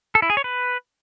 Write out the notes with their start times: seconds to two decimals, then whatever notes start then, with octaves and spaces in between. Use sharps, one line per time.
0.15 A4
0.22 E4
0.30 G#4
0.37 C#5
0.44 B4